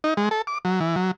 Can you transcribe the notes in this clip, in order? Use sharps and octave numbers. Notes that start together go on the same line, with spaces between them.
D#4
G#3
A4
D6
F#3
E3
F#3